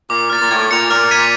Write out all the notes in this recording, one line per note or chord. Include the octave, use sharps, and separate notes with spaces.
A#2 D6
A#2 F6 A6
A#2
A2 G#6
A#2 C#7 F7
A#2 F6
G#6 B6 D#7